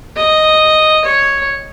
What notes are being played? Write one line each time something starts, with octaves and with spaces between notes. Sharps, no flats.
D#5
C#5